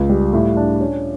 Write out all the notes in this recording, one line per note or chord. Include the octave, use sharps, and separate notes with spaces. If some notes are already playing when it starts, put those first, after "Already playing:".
Already playing: C#2
G3
A2
D4
C#4